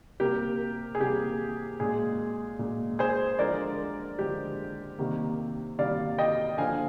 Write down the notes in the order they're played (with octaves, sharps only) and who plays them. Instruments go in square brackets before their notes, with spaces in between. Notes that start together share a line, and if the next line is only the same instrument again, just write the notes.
[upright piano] C3 G3 A#3 G4 A#4
G#4
C3 G3 A#3 G4
A#2 G#3 G#4
A#2 G#3
G#4 C5
D3 F3 G#3 A#4 D5
D3 F3 G#3 G4
C3 D#3 G3 A#3
C3 D#3 G3 A#3 D5 F5
D#5 G5
D3 F3 A#3 F5 G#5